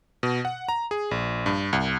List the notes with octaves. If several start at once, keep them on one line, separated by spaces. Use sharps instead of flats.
B2
F#5
A#5
G#4
A#1
G2
C2